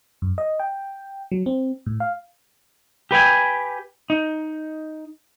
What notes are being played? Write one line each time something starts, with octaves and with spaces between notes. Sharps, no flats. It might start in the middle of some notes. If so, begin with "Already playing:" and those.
F#2
D#5
G5
F#3
C4
A2
F5
G4 B4 G5 G#5
D#4